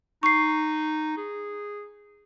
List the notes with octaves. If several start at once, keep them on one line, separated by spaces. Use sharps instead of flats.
D#4 C#6 C7
G#4